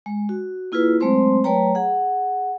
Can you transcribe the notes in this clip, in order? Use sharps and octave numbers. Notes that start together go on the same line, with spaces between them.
G#3
F#4
A#3 E4 F4 G#4 B4
F#3 G#3 A3 C4 C5 C6
F#3 A3 B4 C#5 G5 A#5
G#4 F#5